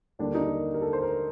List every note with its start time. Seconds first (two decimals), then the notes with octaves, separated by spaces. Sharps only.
0.19 D#2 D3 G3 A#3 D4
0.34 D#4
0.51 A#4
0.74 A#4
0.82 A4
0.93 C5
1.02 A#4